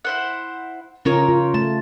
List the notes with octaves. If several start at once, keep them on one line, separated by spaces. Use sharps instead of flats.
E4 C5 F#5
C#3 C#4 D#4 F4 A#4 C#5
F4
A3 A5